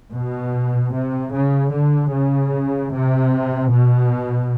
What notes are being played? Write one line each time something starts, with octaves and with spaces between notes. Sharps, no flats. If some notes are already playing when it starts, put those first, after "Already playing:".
B2
C3
C#3
D3
C#3
C3
B2